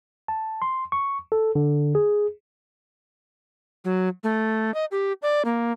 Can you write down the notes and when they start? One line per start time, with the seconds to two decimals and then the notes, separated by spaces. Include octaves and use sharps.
0.28 A5
0.62 C6
0.92 C#6
1.32 A4
1.55 D3
1.95 G#4
3.84 F#3
4.24 A3
4.74 D#5
4.91 G4
5.22 D5
5.45 A#3